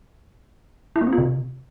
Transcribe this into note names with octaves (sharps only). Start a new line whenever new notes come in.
E4
A#3
C4
F4
C3